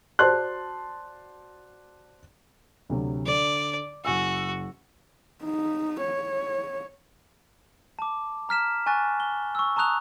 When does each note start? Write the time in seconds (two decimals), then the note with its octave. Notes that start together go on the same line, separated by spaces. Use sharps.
0.19 F#4 C5 D5 A5 C6 F#6
2.90 D2 C3 F#3
3.26 D3 D5
4.05 F#1 F#4 G#5 E6
5.43 D#4
6.01 C#5
7.99 A5 D6
8.49 A#5 F6 B6 E7
8.86 G#5 C#6 F#6 A6
9.20 G7
9.55 C#6 E6
9.76 A5 A#5 C#6 D#6 F#6 F7